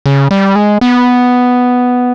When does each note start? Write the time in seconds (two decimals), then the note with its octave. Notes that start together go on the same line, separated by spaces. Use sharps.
0.06 C#3
0.31 G3
0.55 G#3
0.81 B3